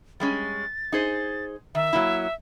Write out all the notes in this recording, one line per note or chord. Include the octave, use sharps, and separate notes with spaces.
G3 G#3 C#4 A6
D#4 G#4 C5
D#3 E5
F#3 A#3 E4